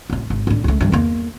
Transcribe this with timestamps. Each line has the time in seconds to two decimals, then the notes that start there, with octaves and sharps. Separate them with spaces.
0.10 D1 A1
0.30 G#1
0.47 A2 D4
0.64 C#2 A3
0.81 G2 F3
0.92 E2 A#3